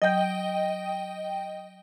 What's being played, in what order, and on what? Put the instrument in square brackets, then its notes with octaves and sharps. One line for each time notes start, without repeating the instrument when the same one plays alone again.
[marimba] F#3 G6 [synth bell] D#5 G5